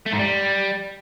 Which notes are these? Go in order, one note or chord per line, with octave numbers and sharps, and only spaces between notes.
A3
G#2
G3